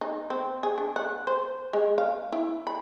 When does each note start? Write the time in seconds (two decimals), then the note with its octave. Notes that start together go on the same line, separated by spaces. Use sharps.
0.01 D#4
0.30 C4
0.63 G#4
0.78 D4
0.96 F#5
1.27 C5
1.73 G#3
1.98 F5
2.32 E4
2.67 B5